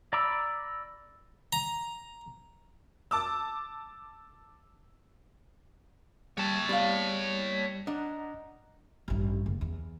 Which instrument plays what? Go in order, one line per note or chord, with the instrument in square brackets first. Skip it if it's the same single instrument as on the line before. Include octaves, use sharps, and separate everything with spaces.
[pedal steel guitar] D5 A#5 B5 D6 E6
[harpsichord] A#5
[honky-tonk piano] A5 D6 E6
[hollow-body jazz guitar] G3 [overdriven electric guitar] C#5 A5
[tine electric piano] G3 [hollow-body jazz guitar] B3 D5 F5
[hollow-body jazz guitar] D4 [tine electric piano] D#5 F#5 A#5
[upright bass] A1 G2
F#1
E2